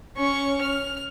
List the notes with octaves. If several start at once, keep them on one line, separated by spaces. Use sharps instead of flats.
C#4 C#6
F6